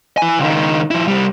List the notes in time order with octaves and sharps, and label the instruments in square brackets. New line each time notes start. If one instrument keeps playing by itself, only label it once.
[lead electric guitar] E4 G#5
C#2 D#3
F3 E4
C2 G3